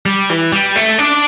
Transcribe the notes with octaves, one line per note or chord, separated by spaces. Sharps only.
G3
E3
G3
A3
D4